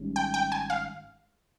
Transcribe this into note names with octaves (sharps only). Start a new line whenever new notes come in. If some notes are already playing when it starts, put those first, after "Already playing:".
Already playing: G#1 G#2 G3 C#4
G5
G5
G#5
F5